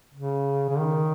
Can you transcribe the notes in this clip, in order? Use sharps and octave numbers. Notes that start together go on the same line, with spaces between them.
C#3
C#3
D#3